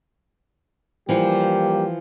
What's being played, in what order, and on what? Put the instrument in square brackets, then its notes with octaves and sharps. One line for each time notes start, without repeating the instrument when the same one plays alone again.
[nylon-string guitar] E3 F3 [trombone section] G3 A#3 G4